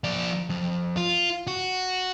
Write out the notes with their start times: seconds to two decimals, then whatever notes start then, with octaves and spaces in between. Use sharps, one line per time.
0.04 F3 D5
0.50 F2
0.97 F4
1.47 F#4